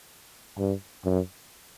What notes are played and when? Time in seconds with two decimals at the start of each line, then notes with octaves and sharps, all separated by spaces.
0.59 G2
1.05 F#2